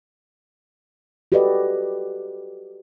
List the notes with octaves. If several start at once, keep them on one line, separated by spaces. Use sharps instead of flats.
F#4 G4 A4 B4 D5 D#5